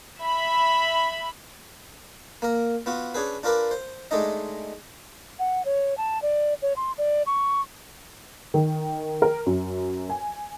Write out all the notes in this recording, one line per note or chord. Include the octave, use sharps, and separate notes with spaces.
E5 B5
A#3 A#4
B3 F4 F#4
C#4 D4 G#4 B4
D4 F4 A#4 B4 D5
C5
G#3 A3 D4 D#4 D#5
F#5
C#5
A5
D5
C#5
C6
D5
C#6
D#3
A#4
F#2
G#5